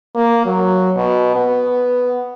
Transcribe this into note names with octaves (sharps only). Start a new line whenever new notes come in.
A#3
F#3
B2
B3